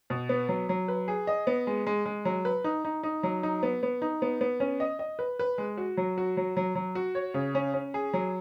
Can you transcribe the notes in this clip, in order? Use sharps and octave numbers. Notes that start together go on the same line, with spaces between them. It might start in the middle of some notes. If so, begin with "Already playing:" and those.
B2
B3
F#3
F#3
B4
G#4
D#5
B3
G#3
G#3
G#3
F#3
B4
D#4
D#4
D#4
F#3
D#4
B3
B3
D#4
B3
B3
C#4
D#5
D#5
B4
B4
G#3
F#4
F#3
F#4
F#3
F#3
F#3
F#4
C#5
C#3
C#4
C#4
G#4
F#3